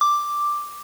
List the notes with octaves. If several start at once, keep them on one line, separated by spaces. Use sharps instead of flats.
D6